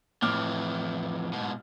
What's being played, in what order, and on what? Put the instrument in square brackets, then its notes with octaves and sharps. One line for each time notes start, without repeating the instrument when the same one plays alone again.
[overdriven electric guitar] F2 E3 [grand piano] A2 D6 F6
[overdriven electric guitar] G#2 B2